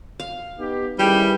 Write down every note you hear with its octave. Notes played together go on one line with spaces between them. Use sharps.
F5
B3 D#4 G4
D#3 G3 C#4 E4 G4 G#4 B4 G5